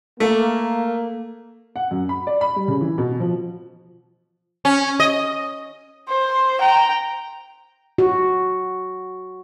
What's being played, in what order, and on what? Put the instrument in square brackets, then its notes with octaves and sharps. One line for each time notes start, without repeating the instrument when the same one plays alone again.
[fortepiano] A3 [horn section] A#3
[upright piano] F#5
F#2
B5
D5
B5
G3
C#3
E3
B2
F3
[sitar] C#4
D#5
[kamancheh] C5
G5 A#5
[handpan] F#4